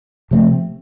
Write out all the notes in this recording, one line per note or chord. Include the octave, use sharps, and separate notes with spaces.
C3 F3 A3 C4